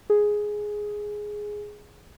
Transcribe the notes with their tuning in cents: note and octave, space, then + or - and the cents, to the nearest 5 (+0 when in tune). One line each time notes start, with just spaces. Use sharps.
G#4 +5